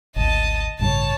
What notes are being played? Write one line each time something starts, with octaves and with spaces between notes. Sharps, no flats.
G#1 D2 D#5 A5
A1 G2 C#3 C#5 A5